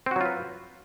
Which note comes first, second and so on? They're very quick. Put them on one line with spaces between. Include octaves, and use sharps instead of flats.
C4 F#4 F#3 F4 B4